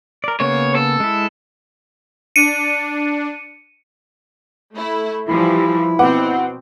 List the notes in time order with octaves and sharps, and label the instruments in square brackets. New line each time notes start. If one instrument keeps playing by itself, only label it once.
[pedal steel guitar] A#4 D5
[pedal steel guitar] C#3 A#3 B3 [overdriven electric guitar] C#5
[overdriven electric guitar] A4
[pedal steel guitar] G#3 E4
[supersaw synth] D4 [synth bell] C#7 D#7
[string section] A3 E4
[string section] E3 F3 G3 [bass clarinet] E4
[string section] B2 C4 [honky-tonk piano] B4 F#5 D6